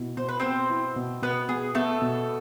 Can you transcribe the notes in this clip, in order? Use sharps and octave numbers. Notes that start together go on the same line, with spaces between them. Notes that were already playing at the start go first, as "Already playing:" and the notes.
Already playing: B2 E4
B2 C5
B4
B3 C4 C5
E4
B2
B2 B3 B4
B3 G#4
A3 B3 A4
B2